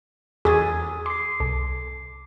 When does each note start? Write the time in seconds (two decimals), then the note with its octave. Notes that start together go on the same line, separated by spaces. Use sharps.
0.45 E2 G#4 A6
1.06 C6 D6 C7
1.40 C2 A4